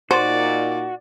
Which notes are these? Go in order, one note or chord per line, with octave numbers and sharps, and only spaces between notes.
A#2 D#4 F#4 C5 D5